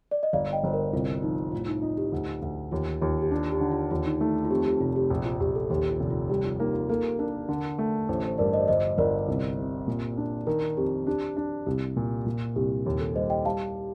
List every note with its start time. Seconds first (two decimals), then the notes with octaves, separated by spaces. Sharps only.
0.11 D5
0.23 D#5
0.33 G1 D5 F5
0.53 D#5 G5
0.64 G1 C5
0.73 A#4
0.93 C2 F4
1.23 F3 D#4
1.52 A2 F4
1.68 D#4
1.82 D#4 F4
1.97 G4
2.12 D2
2.42 D2
2.72 D#2 F4
3.02 D#2 F4
3.22 G4
3.31 D4 F4
3.52 G4
3.61 D3
3.72 F4
3.91 D#2 F4
4.06 D#4
4.21 A3 D#4
4.45 F4
4.50 F2 G4
4.66 G4
4.80 F1 F4
4.96 G4
5.10 A#1
5.25 F4
5.40 A#1 G4
5.56 A4
5.70 D#2 G4
5.91 F4
6.00 F1
6.10 F4
6.30 G3 G4
6.45 F4
6.60 A#3 D#4
6.74 F4
6.89 A#3 A4
7.19 D4 A#4
7.49 D3
7.79 A3
8.09 A1 C5
8.24 C5
8.38 G2 A#4 D5
8.53 C5 D#5
8.61 D5
8.68 G1 C5 D#5
8.98 G1 A#4 D5
9.28 C2
9.58 C3
9.88 A#2
10.17 D4
10.47 D#3 A#4
10.77 F2 G4
11.07 D4 G4
11.37 D4
11.66 C2 G4
11.96 A#2
12.26 A#2 F4
12.56 C2 G4
12.86 D#2
13.00 A4
13.16 G3 C5 D#5
13.30 D#5 G5
13.45 G3 F5 A5